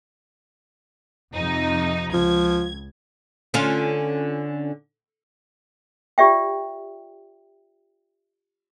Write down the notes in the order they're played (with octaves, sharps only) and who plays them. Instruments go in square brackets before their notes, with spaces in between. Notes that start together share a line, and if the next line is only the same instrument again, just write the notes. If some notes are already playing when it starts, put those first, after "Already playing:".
[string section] F2 C3 D#4
[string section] C#2 G#6 [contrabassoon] F3
[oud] D3 C#4 F4
[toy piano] F4 G4 D5 E5 G5